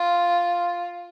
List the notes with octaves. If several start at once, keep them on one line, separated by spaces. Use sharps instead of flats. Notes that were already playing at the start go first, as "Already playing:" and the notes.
Already playing: F4